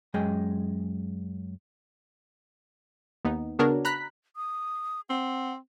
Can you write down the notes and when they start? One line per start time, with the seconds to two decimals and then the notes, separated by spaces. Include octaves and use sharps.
0.14 F#2 G#3 G#4 D#5 G5
3.25 D#2 B3 D#4
3.59 C#3 B3 D4 F#4 A#4 C#5
3.85 A#5 B5 F#6 B6
4.36 D#6
5.10 C4 F#5